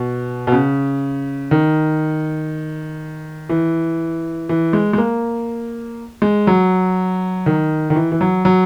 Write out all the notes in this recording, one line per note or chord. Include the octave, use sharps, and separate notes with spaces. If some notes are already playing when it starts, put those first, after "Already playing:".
Already playing: B2
B2
C#3
D#3
E3
E3
G#3
G#3
A#3
G#3
F#3
D#3
D#3
E3
E3
F#3
F#3